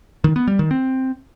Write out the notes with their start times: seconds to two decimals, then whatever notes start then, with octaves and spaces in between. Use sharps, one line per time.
0.24 D#3
0.36 B3
0.47 G3
0.59 D#3
0.71 C4